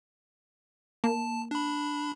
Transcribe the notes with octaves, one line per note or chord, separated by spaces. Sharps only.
A#3 A5
D4 B5